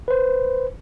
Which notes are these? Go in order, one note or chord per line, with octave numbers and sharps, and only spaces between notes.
B4 C5